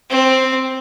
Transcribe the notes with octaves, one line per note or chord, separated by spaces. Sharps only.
C4